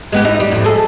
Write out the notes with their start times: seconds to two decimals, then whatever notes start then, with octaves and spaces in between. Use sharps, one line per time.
0.12 G#3 B3 G4
0.24 D#4 E4
0.40 G3
0.52 F2 A2
0.64 G#4 A4